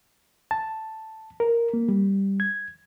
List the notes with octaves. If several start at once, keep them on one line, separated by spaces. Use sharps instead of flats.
A5
A#4
A#3
G3
G#6